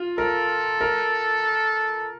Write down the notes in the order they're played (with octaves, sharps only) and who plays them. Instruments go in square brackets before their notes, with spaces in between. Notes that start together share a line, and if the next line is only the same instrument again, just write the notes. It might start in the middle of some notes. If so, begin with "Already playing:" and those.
Already playing: [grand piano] F4
[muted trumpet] A4 [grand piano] A#4
[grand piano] A#4